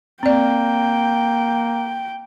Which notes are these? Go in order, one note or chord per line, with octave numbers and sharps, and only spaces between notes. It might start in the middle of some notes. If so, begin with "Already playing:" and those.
A#3 C4 D5 G5